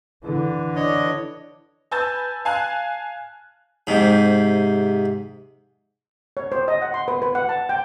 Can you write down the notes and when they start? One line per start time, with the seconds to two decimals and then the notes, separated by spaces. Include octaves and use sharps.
0.24 D3 E3
0.76 D4 C#5 D#5
1.91 B4 G#5 A5 E6 G6 A6
2.45 F5 G#5 A5 F#6
3.87 G#2 C3
6.37 C#5
6.52 C5
6.68 D#5
6.82 F#5
6.94 C6
7.08 B4
7.22 B4
7.35 F#5
7.49 A5
7.69 G5